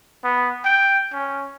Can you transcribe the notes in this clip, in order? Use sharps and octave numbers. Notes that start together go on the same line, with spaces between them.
B3
G5
C#4